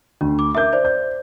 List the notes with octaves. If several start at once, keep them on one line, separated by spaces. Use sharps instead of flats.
D2 D4
D6
A#4 E5 D6 G6
C5 D5
G6